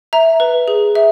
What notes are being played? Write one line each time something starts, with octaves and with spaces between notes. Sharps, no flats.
E5 A#5
B4
G#4
E5